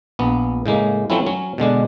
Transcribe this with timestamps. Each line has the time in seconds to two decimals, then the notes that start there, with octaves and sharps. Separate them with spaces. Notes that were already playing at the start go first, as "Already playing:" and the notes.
0.19 A#1 B3
0.66 A2 C#3 G#3 A#3
1.10 F3 F#3 A3 C4 C#4 E4
1.26 F#3 C#4
1.58 B2 D3 G#3 D4